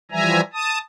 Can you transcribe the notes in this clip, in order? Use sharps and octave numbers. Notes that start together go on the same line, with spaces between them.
E3 F3 G3 E5 G#5 A#5
A5 D#6